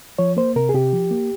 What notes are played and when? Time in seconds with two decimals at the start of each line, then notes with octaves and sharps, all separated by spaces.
0.19 F3 C#5
0.37 A#3 C5
0.56 C3 A#4
0.69 G#4
0.74 C3 G4
0.93 F3
1.11 A#3